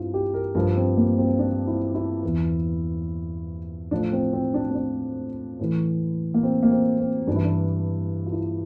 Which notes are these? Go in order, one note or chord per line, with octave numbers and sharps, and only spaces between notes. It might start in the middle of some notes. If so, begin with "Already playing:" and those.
Already playing: G2 C4 D4 E4 F4
G4
A#4
G2 F3 A#4
C4
A#3
C4
D4
E4
E4
E2 E3
A2 F3 D4
C4
C4
D4
C4
D4
A2 E3
A#3
C4
A#3
C4
C4
G2 E3 D4
E4
D4
F4
E4